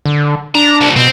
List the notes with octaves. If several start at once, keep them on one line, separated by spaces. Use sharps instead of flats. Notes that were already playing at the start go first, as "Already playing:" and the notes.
D3
D4 A#5
C2 A#2
B2 C4